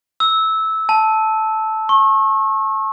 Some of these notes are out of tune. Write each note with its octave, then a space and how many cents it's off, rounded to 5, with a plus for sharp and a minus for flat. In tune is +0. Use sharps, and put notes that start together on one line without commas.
E6 -15
A5 -5
C#6 -35